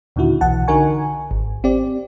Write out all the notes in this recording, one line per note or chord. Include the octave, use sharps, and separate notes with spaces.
D#2 A#2 D3 D#3 E4 F#4
B1 E3 F#5 A5
D3 D#4 F#4 A#4 G#5 C#6
G#1
C4 G4 D5